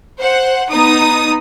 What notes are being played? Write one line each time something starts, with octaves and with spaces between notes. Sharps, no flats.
C5 F#5
B3 D#4 D#6